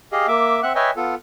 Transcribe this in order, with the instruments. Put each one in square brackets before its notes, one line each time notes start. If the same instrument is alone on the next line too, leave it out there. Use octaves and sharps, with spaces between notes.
[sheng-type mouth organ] G4 G#4 D#5 F5
A#3 E5 D6
C4 E5 F#5 F#6
B4 C#5 D#5 E5 G5 G#5
B3 F4 A4